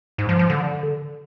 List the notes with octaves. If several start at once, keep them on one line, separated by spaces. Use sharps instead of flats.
G#2
F3
F3
D3